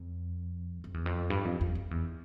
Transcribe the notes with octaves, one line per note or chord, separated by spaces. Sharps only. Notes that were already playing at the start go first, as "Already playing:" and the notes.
Already playing: F2
F2
E2
F2
G2
F2
F2
F2
E2